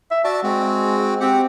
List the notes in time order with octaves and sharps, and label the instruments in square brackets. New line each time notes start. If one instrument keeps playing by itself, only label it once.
[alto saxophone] E5
[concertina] F#4 E5 A5 [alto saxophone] D5
[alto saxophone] G#3 [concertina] C4 F#4
[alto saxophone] C4 [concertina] G4 F#5